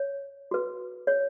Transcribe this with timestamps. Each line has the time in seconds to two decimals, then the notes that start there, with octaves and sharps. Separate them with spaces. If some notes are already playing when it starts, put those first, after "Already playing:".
Already playing: C#5
0.51 F#4 B4
1.07 C#5